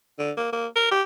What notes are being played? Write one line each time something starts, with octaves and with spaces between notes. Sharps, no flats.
D3
A#3
A#3
A#4
G4